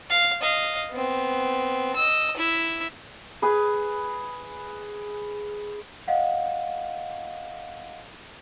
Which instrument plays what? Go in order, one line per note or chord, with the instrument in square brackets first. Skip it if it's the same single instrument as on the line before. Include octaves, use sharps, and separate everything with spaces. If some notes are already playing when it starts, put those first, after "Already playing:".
[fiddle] F5
D#5 F5
B3 C4
D#5 E6
E4 E5
[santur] G#4 B4
[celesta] D#5 F5 F#5